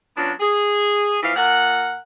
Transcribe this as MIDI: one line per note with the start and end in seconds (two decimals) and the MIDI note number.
0.16 0.32 54
0.16 0.32 59
0.16 0.32 61
0.16 0.32 62
0.16 0.32 65
0.40 1.18 68
1.22 1.35 52
1.22 1.35 53
1.22 1.35 59
1.22 1.35 77
1.36 1.95 46
1.36 1.95 70
1.36 1.95 78